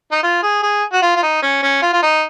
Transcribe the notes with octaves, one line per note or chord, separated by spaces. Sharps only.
D#4
F4
G#4
G#4
F#4
F4
F4
D#4
C#4
C#4
F4
F4
D#4